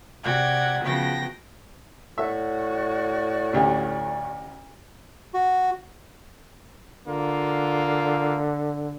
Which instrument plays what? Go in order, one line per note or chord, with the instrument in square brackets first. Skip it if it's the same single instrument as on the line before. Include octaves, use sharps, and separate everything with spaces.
[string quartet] C3 F#4 D5 F#5 G5 G#6
C#3 F3 B3 F#4 G5 A#6
[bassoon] A2 [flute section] F#4 D5 C#6 [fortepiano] E5
[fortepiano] A1 D2 G4
[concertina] F#4
[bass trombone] D3 [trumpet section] A#3 F4